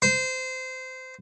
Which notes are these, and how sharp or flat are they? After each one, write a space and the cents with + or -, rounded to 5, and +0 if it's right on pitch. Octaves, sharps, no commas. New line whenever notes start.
C5 -20